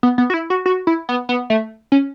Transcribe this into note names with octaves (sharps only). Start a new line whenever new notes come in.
B3
B3
F#4
E4
F#4
F#4
E4
B3
B3
A3
C#4